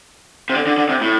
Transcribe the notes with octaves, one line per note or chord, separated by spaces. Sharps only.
C3
D3
D3
D3
C3
A2